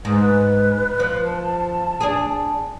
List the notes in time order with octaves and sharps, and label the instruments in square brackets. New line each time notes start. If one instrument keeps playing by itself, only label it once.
[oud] G#2 [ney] B4
[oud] F3
[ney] A5
[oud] D4 G#4